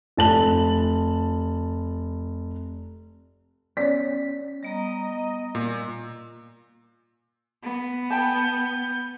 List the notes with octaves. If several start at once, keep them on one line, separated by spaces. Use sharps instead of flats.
F1 A5 F#7
B3 C#4 C#5 D5 B6
G3 B3 D#5 A#5
A#2
B3
G5 A5 G6